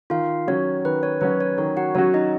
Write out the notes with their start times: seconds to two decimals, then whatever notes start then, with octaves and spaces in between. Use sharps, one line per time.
0.10 D#3 F4 F5
0.47 F#3 C#4 F#4 C#5
0.85 D#3 B4
1.03 C#5
1.21 F#3 C#4 F#4 B4
1.40 C#5
1.58 D#3 C#5
1.77 F#4 F#5
1.95 F#3 C#4 F#4 C#5
2.14 D#4 D#5